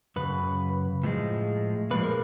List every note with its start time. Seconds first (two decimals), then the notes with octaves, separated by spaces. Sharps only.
0.16 F#2 C#3 B4
1.03 A2 F3 G#3
1.91 A#2 F3 G#3 B4
2.03 A#4